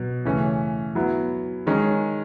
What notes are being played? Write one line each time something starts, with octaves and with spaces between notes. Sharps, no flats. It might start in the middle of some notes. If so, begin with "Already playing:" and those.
Already playing: B2 F#3
C#3 E3 A3 C#4
F#3 B3 E4
D#3 G#3 C#4 G#4